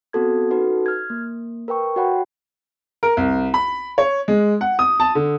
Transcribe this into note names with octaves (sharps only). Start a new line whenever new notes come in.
B3 C4 F#4 A4 G#6
C#4 D#4 F#4 A4 B4
F6 G#6
A#3
A#4 B4 G5 C#6
F#4 C#5 F#5 G5 B5
A#4
C2
B5
C#5
G#3
F#5
D#6
A5
D3